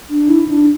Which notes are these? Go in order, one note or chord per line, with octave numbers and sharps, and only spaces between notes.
D4
E4
D4